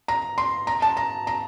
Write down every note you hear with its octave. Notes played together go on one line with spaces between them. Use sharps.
A#5
C6
A#5
A5
A#5
A#5